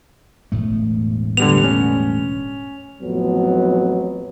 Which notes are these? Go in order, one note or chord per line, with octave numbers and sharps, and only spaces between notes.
E1 A2 A3
D3 G3 B3 F7
C#4
A1 F2 A2 F#3 B3